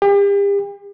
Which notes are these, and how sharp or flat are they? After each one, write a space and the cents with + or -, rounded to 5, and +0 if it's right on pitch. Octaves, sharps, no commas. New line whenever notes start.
G4 +40